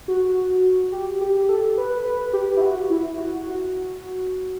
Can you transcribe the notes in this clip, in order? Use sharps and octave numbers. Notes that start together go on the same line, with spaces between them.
F#4
G4
G4
G4
A4
B4
B4
G4
E4
F#4
E4
F#4
F#4